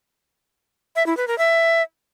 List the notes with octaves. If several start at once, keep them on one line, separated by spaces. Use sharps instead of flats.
E5
E4
B4
A#4
E5